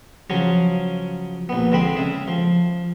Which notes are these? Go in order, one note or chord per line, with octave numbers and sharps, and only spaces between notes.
C#3 F3 F#3 C#4
A#1 B3
D3 G#3 C4 B5 C6
C#3 E5
F3